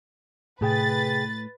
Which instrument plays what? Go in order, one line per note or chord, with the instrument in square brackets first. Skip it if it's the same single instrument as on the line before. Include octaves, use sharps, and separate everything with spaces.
[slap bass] A2 [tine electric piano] C3 G#4 G5 [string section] B4 A6